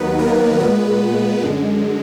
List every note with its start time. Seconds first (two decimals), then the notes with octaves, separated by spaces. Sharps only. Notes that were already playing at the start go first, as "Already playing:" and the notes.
Already playing: D#2 D#3 F#3 B3 B4
0.19 A#3 A#4
0.60 A#2 G#3 B3 B4
1.42 F#2 D3 G#3